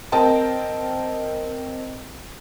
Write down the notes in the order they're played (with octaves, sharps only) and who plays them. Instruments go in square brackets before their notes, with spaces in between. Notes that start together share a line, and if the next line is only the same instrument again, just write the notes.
[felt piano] C4 A#4 D#5 G5 A5